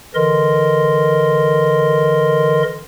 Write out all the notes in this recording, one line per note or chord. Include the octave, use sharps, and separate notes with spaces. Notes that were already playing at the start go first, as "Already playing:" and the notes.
D3 E3 A#4 D#5 C6